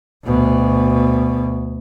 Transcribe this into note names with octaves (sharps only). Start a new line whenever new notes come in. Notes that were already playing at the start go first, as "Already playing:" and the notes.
D2 B2